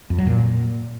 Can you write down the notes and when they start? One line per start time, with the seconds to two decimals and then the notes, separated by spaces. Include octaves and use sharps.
0.10 F2
0.18 F#3
0.27 A#2